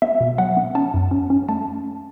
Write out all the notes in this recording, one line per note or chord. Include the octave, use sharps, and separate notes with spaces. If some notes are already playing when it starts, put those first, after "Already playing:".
B3 E5
B2
F#3 F#5
B3
C#4 A5
F#2
C#4
C#4
A3 A5